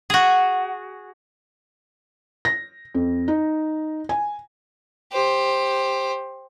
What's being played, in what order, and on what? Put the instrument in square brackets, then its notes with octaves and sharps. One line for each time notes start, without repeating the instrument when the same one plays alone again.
[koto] F#4 G#4
[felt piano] A#6
F2
D#4
G#5
[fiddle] G4 C5